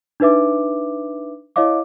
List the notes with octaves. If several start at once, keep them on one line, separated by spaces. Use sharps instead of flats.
D4 D#4 B4 E5 D6
E4 C#5 D#5 F5 D6